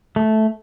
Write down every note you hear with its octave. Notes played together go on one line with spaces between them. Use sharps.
A3